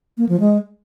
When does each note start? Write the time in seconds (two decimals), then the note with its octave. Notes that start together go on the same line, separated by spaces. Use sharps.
0.18 A#3
0.29 F3
0.40 G#3